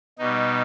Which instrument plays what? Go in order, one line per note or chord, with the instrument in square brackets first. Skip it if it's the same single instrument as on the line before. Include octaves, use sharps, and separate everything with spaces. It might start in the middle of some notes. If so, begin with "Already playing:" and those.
[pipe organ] B2 G3 D#4